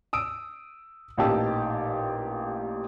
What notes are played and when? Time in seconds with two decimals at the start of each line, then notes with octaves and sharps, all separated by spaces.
0.13 D#6 E6 D7
1.17 A1 A#2 D#4 G4 A5 E6